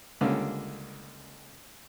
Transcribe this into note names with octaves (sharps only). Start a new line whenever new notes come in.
C#2 D3 G3 A#3 C#4